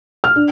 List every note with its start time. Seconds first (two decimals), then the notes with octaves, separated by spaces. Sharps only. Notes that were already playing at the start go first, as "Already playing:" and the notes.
0.24 F6
0.36 D4